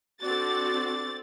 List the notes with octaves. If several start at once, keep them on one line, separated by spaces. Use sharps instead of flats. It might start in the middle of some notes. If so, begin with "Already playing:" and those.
C4 D4 F#4 A4 D5 D6 A6